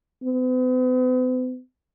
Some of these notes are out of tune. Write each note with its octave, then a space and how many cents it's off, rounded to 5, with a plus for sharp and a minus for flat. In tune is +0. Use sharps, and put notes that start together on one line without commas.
B3 +45